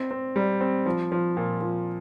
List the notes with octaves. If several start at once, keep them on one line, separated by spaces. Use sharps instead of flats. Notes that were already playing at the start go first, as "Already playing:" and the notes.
Already playing: C4
C4
G3
C4
F3
F3
A#2
F3